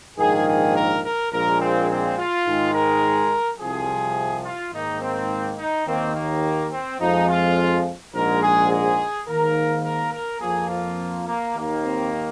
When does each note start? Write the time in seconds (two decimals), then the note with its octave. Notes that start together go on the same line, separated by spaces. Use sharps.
0.19 A#1 G#2 D#3 A#3 G#4
0.47 G#4
0.75 A#4
1.04 A#4
1.32 A#1 A#2 G#3 A#4
1.61 C4
1.89 C4
2.18 F4
2.46 G#2 D#3 G#3
2.74 A#4
3.59 C2 C3 F3 G#4
4.45 F4
4.73 G#2 D#3 A#3 D#4
5.01 C4
5.58 D#4
5.86 D#2 D#3 A#3 C4
6.15 A#3
6.72 C4
7.00 F2 F3 G#3 D#4
7.29 F4
8.14 A#1 G#2 G#3 A#4
8.42 G#4
8.71 G#4
9.28 G#2 D#3 A#3 A#4
9.84 A#4
10.13 A#4
10.41 F2 F3 A#3 G#4
10.69 F4
11.26 A#3
11.55 D#2 D#3 A#3
11.83 C4